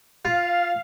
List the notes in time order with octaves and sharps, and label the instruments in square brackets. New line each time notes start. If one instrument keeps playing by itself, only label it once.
[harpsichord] F4 [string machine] F5